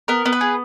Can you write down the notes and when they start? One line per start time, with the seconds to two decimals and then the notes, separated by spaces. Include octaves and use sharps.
0.08 B3 A#4
0.26 B3
0.33 B4
0.41 G#4